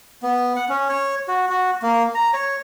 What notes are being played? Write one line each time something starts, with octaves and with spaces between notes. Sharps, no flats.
B3
F#5
C#4
C#5
F#4
F#4
A#3
A#5
C#5